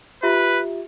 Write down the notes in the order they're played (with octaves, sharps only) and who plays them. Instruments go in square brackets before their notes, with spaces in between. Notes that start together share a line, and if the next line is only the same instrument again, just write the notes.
[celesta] F4 G4 E5 [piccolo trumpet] B4